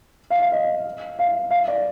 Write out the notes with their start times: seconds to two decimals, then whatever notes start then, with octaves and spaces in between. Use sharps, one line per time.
0.30 F5
0.42 F5
0.52 D#5
1.19 F5
1.51 F5
1.68 D5